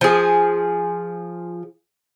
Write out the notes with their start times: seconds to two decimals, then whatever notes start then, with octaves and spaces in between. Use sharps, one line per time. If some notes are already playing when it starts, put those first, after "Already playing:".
0.01 F3 G#4